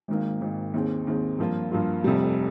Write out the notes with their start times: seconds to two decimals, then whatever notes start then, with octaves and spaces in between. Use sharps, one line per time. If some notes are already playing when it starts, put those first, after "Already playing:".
0.08 G#1 G#2 D#3 A#3
0.41 G#1 G#2 D#3 A#3
0.74 D#2 D#3 G#3 C4
1.07 D#2 D#3 G#3 C4
1.39 G2 F3 A#3 F4
1.71 G2 F3 A#3 F4
2.04 F1 F2 C3 G3